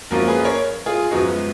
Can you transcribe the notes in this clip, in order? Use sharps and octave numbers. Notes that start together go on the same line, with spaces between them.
F#2 F3 A#3 C#4 F4 F#4 A#4
G#4 B4
A#4 C#5
F4 G#4
F#2 F3 G#3 B3 D#4 F#4